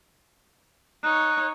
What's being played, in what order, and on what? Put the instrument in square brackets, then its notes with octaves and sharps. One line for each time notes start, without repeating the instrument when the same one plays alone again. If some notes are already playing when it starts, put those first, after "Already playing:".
[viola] D#4 C#5 [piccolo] F#6